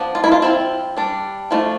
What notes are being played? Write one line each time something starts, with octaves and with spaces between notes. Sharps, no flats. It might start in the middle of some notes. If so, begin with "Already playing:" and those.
Already playing: F3 B3 D4
F4
E4
F4
F3 C4 E4
G3 D4
F3 A3 D4 F4